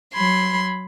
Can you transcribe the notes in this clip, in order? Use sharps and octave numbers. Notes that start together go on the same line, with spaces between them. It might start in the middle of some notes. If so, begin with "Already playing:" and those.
F#3 B5 C6 G#6